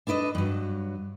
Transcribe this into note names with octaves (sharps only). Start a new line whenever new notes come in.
D4 A4 B4 D5 D#5
G2 F#3